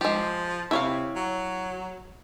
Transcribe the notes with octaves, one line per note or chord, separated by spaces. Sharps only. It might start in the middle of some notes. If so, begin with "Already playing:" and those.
F3 G#3 G4
C3 E4 C#5 F5
F#3